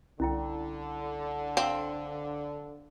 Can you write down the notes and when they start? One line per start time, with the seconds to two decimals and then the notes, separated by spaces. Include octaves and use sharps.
0.20 C2 D3 C#4 E4 G5
1.57 C4 F5 E6